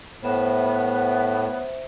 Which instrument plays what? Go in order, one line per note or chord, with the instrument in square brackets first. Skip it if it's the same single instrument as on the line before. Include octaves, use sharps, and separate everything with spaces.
[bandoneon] A2 [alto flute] B3 [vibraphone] C5 E5